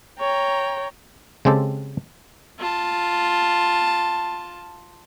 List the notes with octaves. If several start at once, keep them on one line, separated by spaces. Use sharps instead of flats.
C#5 G5 A#5
C#3 G#3 C4 G4 A4
F4 A5